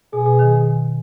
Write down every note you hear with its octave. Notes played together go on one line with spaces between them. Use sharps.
B2 G#4
B2
D#3